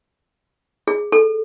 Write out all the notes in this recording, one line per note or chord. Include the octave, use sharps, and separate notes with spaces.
G#4
A4